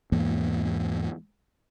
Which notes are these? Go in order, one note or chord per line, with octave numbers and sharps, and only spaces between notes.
E2 G#2 E3 A#3